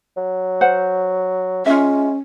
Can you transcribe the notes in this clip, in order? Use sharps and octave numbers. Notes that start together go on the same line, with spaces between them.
F#3
C5 F#5
G#3 C#4 F4 E5